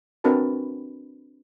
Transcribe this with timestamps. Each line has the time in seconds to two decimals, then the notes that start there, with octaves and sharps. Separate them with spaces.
0.24 C4 D4 F#4 A#4 B4 A5